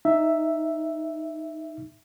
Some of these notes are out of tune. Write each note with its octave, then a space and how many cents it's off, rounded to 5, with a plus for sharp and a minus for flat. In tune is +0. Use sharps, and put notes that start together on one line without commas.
D#4 +0 E5 +0